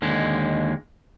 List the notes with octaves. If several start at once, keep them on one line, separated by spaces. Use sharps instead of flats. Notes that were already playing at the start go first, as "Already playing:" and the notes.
D#2 D3 G#3